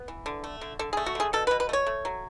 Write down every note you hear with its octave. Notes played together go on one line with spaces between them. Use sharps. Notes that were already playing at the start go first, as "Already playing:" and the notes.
Already playing: B3
E3
D3
A3
D3
D3 A4
A3 G#4
F#4
D3 G#4
B2 A4
B4
B2
B4
A3
C#5
A3
F#3